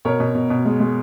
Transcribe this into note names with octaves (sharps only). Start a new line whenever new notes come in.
B2 A#4 C#5
B2
B2
B2
G#3
G#3